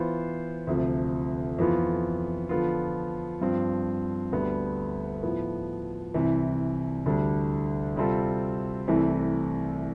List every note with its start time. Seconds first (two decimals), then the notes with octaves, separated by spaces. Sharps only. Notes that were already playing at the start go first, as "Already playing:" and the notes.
Already playing: E3 B3 F4 C5
0.67 D2 C3 F3
1.58 F2 E3 B3 F4
2.49 D3 F3 B3 F4
3.41 G2 F3 C4
4.32 D2 D3 G3 B3
5.23 A2 F3 B3
6.14 C2 C3 E3
7.06 D2 D3 G3 D4
7.96 C3 G3 C4 F4 A4
8.88 C2 C3 E3 A3